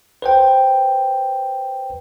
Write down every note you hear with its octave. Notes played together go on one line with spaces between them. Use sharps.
B4 C5 G5